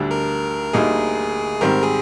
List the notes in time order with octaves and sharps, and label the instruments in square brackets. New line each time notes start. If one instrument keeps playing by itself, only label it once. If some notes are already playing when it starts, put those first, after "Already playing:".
Already playing: [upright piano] D2 D3 G3 D4
[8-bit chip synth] A#4
[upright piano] D2 D3 G3 A#3 D#4 [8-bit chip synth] G#4
[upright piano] G#2 D#3 G3 C4 [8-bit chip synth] A#4
[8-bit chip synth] G#4